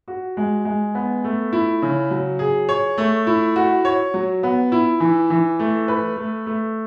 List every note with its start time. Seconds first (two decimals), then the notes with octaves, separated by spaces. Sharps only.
0.08 F#4
0.37 G#3
0.65 G#3
0.95 B3
1.24 A3
1.52 E4
1.82 C#3
2.11 F#3
2.39 G#4
2.69 C#5
2.98 A3
3.27 E4
3.56 F#4
3.85 C#5
4.14 F#3
4.43 B3
4.72 E4
5.00 E3
5.30 E3
5.59 A3
5.88 B4
6.17 A3
6.46 A3